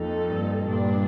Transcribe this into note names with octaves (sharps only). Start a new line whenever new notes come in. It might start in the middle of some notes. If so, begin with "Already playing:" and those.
Already playing: F2 F3 A#3 D#4 A4
G2
G2 A#2 G3 D4